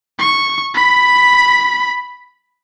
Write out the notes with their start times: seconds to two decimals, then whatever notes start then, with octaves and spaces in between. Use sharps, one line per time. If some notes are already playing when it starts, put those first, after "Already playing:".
0.19 C#6
0.74 B5 B6